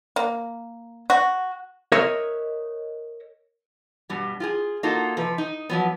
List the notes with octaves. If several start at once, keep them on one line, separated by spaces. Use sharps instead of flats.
A#3
F#4
A#4 C#5 D#5 E5
G2 B2 G3
F4 F#4 G#4
A#3 D#4 F4 F#4 A4
C3 F3 B4
D#4
F3 F#3 B3